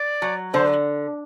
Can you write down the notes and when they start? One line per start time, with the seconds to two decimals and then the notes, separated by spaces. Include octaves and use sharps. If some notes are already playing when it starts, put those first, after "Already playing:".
Already playing: D5
0.22 F#3
0.53 D3 C5